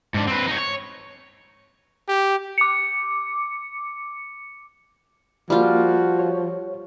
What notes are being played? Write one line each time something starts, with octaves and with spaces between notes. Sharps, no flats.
G#2 D4
C4 B4
D#4 C#5
C#5
G4
D6 C#7
F3 G3 A#3 F4 F#4 C5
C#5